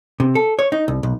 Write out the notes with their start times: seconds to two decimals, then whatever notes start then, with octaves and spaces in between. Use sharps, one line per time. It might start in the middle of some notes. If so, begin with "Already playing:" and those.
0.20 C3
0.35 A4
0.59 C#5
0.72 D#4
0.88 C2
1.03 B1